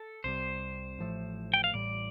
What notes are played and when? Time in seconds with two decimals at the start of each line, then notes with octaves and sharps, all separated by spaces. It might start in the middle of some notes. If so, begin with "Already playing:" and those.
Already playing: A4
0.24 C2 C3 G3 C5
0.99 A1 A2 F3 A3
1.54 G5
1.64 F5
1.73 A1 A2 G3 D5